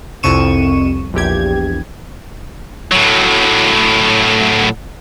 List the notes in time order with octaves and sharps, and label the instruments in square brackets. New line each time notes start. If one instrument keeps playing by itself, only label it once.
[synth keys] C2 F2 C#6 D#7 E7
A#1 E2 G4 G#6
[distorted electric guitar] A2 F#3